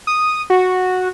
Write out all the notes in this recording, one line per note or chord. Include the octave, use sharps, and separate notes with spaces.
D#6
F#4